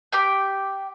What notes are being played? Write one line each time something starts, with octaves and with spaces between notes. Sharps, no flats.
G4 G5 G6